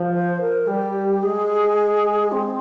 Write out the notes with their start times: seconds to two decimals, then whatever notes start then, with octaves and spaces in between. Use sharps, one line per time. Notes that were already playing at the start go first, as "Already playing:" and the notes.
Already playing: F3
0.13 C5
0.41 A#4
0.67 G3 G4
1.23 G#3 G#4
2.32 C4